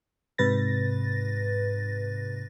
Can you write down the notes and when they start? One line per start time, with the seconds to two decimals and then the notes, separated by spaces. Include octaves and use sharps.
0.38 G#2 C3 B4 A6 A#6